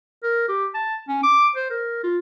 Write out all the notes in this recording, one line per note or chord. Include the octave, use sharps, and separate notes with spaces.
A#4
G4
A5
C#4
D6
C5
A#4
F4